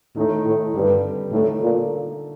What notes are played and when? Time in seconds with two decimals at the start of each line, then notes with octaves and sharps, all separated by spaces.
0.16 A2 D#3 A3 D#4
0.45 A2
0.74 G2 D3 G3 C4
1.32 A2 D3 A3 D#4
1.62 A#2